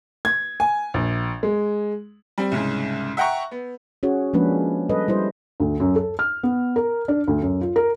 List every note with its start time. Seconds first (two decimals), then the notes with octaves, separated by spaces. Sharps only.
0.25 G#6
0.60 G#5
0.94 A#1
1.43 G#3
2.38 G3 C4
2.52 C2 G#2 C#3
3.17 E5 F#5 G5 A#5 C#6
3.51 B3
4.03 C#4 F#4 G#4 C#5
4.33 F3 G#3 A#3 C#4 D4 B4
4.89 G3 A4 B4 D#5
5.08 G3 E4 C5
5.60 D2
5.80 F#2
5.96 A4
6.19 F6
6.43 B3
6.76 A#4
7.08 D4
7.28 D2
7.42 F#2
7.61 F4
7.76 A#4